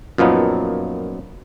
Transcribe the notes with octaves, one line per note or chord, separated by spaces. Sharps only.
F#2 A#2 F3 B3 D#4